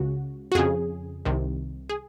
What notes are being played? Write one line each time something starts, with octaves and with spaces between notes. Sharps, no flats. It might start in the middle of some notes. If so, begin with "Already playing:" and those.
Already playing: C#2 C#3 F#4
F#4
F2 C#3 G#4
C2 C3 D#3
G#4